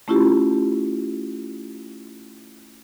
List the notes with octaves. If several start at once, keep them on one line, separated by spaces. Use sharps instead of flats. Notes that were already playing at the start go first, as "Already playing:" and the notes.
A3 C#4 E4 F4 G4